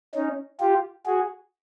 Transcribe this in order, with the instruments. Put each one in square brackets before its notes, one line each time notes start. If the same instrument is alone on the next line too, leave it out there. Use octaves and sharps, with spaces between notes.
[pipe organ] C#4 D#4
F4 G4
F#4 G#4